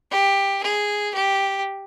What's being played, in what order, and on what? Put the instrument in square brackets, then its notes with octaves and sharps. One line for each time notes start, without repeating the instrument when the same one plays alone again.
[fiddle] G4
G#4
G4